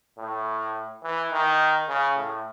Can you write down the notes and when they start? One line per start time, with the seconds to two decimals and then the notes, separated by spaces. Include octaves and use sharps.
0.19 A2
1.03 E3
1.32 D#3
1.89 C#3
2.16 A2